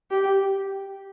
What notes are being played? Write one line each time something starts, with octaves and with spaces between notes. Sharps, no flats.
G4